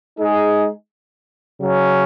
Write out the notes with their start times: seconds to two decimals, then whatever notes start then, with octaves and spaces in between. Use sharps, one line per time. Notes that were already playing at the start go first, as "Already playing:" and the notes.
0.18 G#3 D#4 G#4
1.59 C#3 F#3 C#4